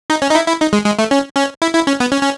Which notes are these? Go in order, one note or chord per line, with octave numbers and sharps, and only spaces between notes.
D#4
C#4
D#4
E4
E4
D#4
G#3
G#3
A3
C#4
C#4
E4
E4
C#4
B3
C#4
C#4